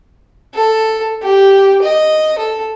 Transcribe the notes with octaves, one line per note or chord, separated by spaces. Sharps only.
A4
G4
D#5
A4